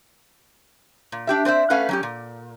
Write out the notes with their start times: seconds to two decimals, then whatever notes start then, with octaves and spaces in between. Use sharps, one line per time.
1.12 A#2
1.27 D4 G4 E5
1.45 C4 C5 D5 E5
1.70 A3 C#4 B4 F5 F#5
1.89 F#3 C#4 G4
2.03 A#2